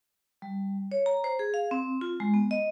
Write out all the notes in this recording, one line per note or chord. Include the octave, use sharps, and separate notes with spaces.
G3
C#5
A#5
C5
G#4
F5
C4
F4
G#3
B3
D#5